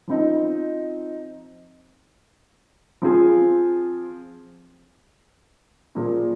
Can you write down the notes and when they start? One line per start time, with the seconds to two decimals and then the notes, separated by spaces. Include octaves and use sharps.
0.08 F3 C4 D#4
3.02 F3 C4 F4 G#4
5.95 A#2 F3 A#3 G#4